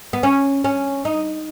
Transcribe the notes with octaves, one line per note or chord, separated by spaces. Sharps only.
B3
C#4
C#4
D#4